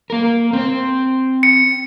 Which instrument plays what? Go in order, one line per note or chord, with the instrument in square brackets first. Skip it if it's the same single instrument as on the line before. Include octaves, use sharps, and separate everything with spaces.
[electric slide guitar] A#3 A#4
C4 C5
[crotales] C#7